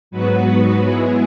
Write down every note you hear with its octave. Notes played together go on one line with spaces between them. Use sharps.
G#2 F#3 B3 F#4 B4
G#3 B3 E4 G#4